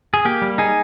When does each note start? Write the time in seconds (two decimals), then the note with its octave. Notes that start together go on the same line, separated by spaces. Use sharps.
0.14 G#4
0.25 A#3 G4
0.42 G3
0.58 D#4 G#4